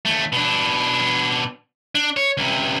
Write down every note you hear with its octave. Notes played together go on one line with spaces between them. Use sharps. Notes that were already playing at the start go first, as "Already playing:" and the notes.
D#2 A3
B2 D4
D4
C#5
C#2 C3